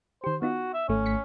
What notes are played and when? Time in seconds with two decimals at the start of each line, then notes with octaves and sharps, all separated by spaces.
0.24 D#3 G4 C5
0.42 B3 D#4 F4 F#4
0.74 E5
0.88 G#1 A3 C#4
1.06 B6 C#7